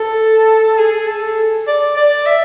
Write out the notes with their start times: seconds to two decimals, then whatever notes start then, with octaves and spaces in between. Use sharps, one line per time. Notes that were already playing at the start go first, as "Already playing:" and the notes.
Already playing: A4
0.78 G#4
1.08 A4
1.67 D5
1.97 D5
2.26 E5